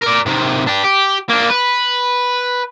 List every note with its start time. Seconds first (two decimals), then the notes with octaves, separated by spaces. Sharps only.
0.02 A#4 D5
0.26 C3 D#3
0.67 D4 G4
0.84 G4
1.29 A#3 D4
1.50 B4